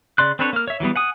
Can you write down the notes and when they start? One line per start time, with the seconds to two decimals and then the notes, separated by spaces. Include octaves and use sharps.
0.18 C#3 D5 C6 F#6
0.39 C4 D4 A4 B4 C#5
0.53 A#3 F6
0.68 C#5 E5
0.80 E3 F#3 G3 B3
0.96 F#5 G#5 D#6